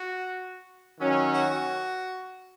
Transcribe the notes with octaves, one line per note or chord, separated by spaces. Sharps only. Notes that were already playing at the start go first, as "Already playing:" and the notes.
Already playing: F#4
D#3 F#3 C#4
F#4